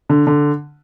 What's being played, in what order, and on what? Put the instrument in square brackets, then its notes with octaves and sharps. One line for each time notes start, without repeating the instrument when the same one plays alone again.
[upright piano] D3
D3